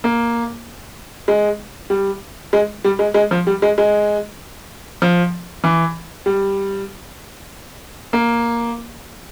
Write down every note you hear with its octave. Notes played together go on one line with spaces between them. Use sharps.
A#3
G#3
G3
G#3
G3
G#3
G#3
F3
G3
G#3
G#3
F3
E3
G3
A#3